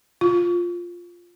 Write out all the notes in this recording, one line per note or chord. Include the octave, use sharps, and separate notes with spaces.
F4